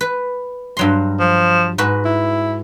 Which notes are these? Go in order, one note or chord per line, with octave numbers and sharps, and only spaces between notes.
B4
G2 F#3 C6
F3
G#2 F#4 B4
E4